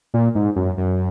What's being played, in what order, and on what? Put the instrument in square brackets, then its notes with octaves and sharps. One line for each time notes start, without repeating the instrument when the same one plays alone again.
[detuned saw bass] A#2
G#2
F#2
F#2